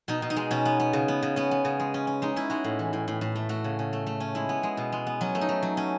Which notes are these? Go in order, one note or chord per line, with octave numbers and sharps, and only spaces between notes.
B2 D#4
B2
D#4
G#3
B2 C#4
B3
B3
C#3
B3
C#3
B3 C#4
B3
C#3
G#3
C#4
C#4
G#3 D#4
C#4 E4
G#3 F#4
A2
E3
A2
A2
A2
A3
A3 F#4
C#3
C#3
A3
A3
C#4
G#3 E4
B3
G#3
B2
G#3
B3
F#3 C#4
A3
D#4
A3
F#3
C#4